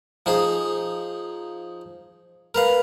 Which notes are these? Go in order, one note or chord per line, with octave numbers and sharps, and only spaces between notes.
F3 D#4 G#4
A#4 B4 F5